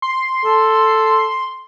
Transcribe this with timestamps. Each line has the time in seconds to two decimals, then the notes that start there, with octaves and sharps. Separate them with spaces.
0.02 C6
0.45 A4